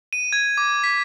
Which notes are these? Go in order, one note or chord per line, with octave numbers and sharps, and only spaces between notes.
D#7
G#6
D6
B6